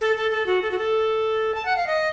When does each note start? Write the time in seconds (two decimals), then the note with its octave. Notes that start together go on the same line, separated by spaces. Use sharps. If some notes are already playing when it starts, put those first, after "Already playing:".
0.01 A4
0.16 A4
0.31 A4
0.46 F#4
0.62 A4
0.71 F#4
0.78 A4
1.55 A5
1.65 F#5
1.76 F5
1.87 D#5